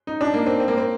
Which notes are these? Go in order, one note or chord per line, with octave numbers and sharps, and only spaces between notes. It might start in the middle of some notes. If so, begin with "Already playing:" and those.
D#4
D4
A#3
C4
C4
A#3
C4